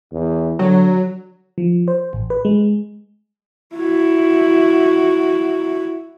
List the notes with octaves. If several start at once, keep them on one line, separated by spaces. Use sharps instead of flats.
E2
D3 F#3
F3
C5
A1
B4
G#3
E4 F#4